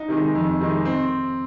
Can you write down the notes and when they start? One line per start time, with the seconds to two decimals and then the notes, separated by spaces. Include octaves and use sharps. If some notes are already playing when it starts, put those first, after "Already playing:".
Already playing: D#4
0.08 C3 D#3 G#3
0.35 F2
0.61 C3 D#3 G#3
0.85 C4